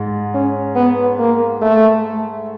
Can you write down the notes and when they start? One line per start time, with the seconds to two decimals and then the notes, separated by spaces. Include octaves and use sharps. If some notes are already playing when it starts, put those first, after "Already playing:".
Already playing: G#2
0.34 C#4
0.75 B3
1.19 A#3
1.61 A3